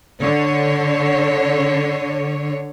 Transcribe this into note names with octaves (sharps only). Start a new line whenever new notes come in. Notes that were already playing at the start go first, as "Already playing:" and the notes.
D3 C#5